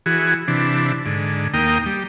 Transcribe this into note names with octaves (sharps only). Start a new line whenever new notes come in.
E3 F#4 G#4
C3 E3 D4
G#2 D3
D#2 A#3 G5 D#6
G3